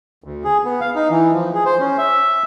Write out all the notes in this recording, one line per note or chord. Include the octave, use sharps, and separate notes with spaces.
D2
G#4
B3
F5
D#4
E3
F3
G#4
C5
C#4
E5